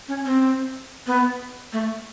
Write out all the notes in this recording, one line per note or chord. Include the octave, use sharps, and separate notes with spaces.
C#4
C4
B3
A3